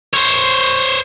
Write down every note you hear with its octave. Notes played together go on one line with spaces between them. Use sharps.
C5 C#5